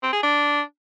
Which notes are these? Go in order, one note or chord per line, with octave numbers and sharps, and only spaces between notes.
C4
G#4
D4